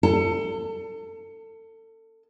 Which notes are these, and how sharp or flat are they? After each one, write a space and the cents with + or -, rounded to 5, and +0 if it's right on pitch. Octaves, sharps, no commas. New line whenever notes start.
A4 +30